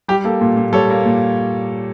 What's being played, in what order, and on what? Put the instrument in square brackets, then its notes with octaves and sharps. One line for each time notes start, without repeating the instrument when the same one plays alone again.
[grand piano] G3 G4
A#3 A4
A#2
A#2
G3 A4 C#5
A#3
A#2